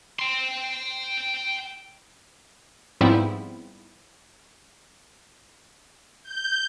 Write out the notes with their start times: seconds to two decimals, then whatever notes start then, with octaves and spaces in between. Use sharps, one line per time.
0.19 G5 C6
3.01 G#2 F3 G3 B3 C4 E4
6.24 G6